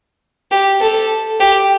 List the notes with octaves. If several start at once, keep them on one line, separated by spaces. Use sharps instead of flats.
G4
A4
G4